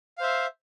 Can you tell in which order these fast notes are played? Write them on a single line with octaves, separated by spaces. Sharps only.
F5 C5 E5